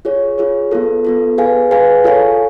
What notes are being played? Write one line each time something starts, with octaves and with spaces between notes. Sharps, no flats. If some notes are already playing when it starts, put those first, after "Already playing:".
F4 G#4 C#5
F4 G#4 C#5
B3 F4 A4
B3 F4 A4
G#4 B4 F5 G#5
G#4 B4 F5 G#5
F4 A4 C#5 F5 G#5